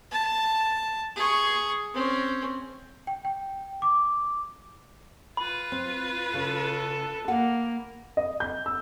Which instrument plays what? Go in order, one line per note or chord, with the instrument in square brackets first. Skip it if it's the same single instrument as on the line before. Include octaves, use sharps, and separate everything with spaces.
[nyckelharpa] A5
G#4 C#6
C4 C#4
[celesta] G5
G5
D6
[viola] F4 B4 [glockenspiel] B5
[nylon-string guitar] C4
[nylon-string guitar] C#3 [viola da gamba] A4
[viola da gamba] A#3 [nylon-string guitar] F5 F#5
[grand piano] D#5
G6
E6